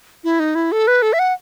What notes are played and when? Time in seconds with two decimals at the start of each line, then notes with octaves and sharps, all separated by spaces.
0.24 E4
0.40 D#4
0.55 E4
0.72 A4
0.87 B4
1.02 A4
1.13 E5
1.19 F#5